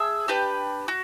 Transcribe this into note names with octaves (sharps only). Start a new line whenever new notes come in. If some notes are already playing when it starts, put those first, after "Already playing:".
Already playing: G#4 E5 A5
D4 G4 B4
F#4